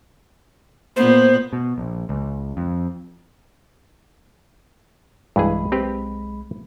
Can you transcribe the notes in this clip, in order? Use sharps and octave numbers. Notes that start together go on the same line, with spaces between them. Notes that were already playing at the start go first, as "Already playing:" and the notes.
A#2 B3 C5
B2
A#1
C#2
F2
B1 G2 E3 G#3 G#4 B5
C4 G4 B4